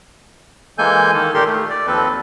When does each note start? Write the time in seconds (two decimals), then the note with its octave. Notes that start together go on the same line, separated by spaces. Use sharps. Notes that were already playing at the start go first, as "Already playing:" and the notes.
0.78 E3 G#3 A#3 A4 G#5 G6
1.13 D#3 A4
1.34 A#2 D#3 G4 A4 A#4 C6
1.47 A3
1.70 D5
1.87 D#2 F3 C4 A4 B4